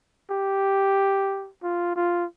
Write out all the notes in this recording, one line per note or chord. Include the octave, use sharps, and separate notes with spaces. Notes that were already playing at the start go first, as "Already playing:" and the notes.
G4
F4
F4